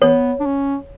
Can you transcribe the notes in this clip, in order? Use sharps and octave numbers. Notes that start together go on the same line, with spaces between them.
B3 C#5
D4
C#4